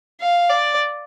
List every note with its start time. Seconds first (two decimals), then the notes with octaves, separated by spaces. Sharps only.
0.21 F5
0.50 D5